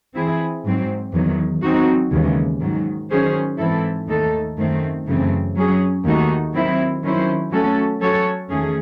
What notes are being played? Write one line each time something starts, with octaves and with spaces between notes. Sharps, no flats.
E3 C4 E4 G#4
G#2 F#3 C4
E2 D#3 F#3
F#3 C4 D#4 F#4
D#2 C#3 E3 G#3
G#2 D#3 F#3
D#3 F#3 C#4 G#4 C5
G#2 E3 C4 E4 A4
D#2 D#3 A3 D#4 A4
F#2 D#3 A3 C4
F#2 C#3 E3 A3 C4
F#3 C#4 G#4
D#2 D#3 A3 D#4 F#4
D#3 F#3 C4 E4
D#3 F#3 C#4 E4 C5
F#3 A3 C#4 F#4 A4
F#3 C#4 F#4 A4 C#5
E2 D#3 A3 C#4 G#4